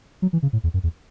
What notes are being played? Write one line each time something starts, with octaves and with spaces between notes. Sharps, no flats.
F#3
E3
C#3
A2
E2
F#2
E2